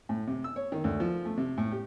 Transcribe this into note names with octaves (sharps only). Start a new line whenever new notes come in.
A2
C3
E6
C#5
D#3
D2
F3
A3
C3
A2
G4